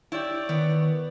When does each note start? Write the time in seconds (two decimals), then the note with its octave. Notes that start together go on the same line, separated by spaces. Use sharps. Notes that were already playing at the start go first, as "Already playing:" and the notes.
0.12 E4 G4 C#5 D5
0.49 D#3 B3